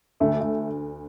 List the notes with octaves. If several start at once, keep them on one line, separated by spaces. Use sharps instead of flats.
D2 D3 A3
A3